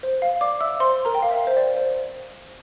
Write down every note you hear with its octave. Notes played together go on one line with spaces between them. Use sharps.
C5
F5
D5 D6
E5 E6
C5 C6
A#4 A#5
G5
F5
E5
C5
D5
C5